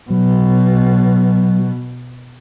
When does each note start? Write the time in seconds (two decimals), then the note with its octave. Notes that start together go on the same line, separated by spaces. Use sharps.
0.10 B2 F#3